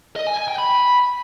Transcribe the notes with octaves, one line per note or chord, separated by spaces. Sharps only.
D#5
G#5
G#5
G5
B5